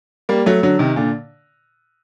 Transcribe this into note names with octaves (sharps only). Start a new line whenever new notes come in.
G3 A#3
F#3 A3
D3 F#3
C3 D#3
A#2 D3